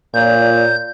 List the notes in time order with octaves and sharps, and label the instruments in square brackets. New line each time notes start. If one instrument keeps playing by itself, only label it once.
[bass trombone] A#2 [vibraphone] F4 C#5 D5 [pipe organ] G6